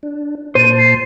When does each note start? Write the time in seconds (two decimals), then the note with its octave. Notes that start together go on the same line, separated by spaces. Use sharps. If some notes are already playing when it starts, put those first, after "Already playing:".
0.03 D4
0.55 A#2 C5 A5 D#7
0.78 C7